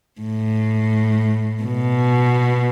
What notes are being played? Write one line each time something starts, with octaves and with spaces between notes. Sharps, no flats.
A2
B2